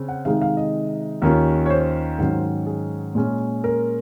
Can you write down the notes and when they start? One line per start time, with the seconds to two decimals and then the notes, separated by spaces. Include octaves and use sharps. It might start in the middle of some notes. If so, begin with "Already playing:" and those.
Already playing: C#3 C4
0.09 F#5
0.25 C3 D#3 G#3 D#4 F5
0.42 F5
0.57 D#5
1.22 D#2 D#3 A#3 C#4 F4
1.66 C#5
1.70 C5
2.19 G#2 D#3 F#3 C#4
2.67 G#4
3.15 A#2 G#3 C#4
3.64 A#4